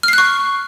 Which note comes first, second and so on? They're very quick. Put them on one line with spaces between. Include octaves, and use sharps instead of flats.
F6 C7 F#6 C#6